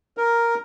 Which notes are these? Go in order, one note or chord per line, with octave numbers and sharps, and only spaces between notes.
A#4